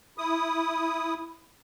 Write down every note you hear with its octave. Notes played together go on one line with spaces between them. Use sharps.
E4 D#6